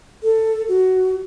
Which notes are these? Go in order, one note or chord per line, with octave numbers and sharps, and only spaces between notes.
A4
F#4